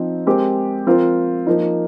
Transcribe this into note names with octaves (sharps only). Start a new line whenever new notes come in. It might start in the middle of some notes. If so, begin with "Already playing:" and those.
Already playing: F3 C4 D#4
G#3 C4 G4 A#4
F3 C4 F4 A#4
F3 A#3 D#4